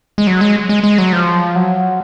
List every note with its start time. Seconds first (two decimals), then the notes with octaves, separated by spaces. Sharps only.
0.18 G#3
0.27 F#3
0.41 G#3
0.69 G#3
0.84 G#3
0.98 F#3
1.12 F3
1.55 F#3